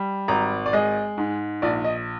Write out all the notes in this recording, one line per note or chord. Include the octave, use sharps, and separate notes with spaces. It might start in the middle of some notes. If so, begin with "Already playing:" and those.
Already playing: G3
G#1 A#5
D5
G#3 D#5
G#2
A#1 D5
D#5